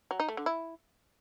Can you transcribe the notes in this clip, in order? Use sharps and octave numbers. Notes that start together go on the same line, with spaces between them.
F#3
D#4
A3
D3
E4